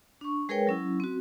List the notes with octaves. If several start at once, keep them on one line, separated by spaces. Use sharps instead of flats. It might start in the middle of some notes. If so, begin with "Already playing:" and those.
D4 C#6
G#3 G#4 A#4 B4 C#5 G5
F#3 C#4 E4
C4 F#4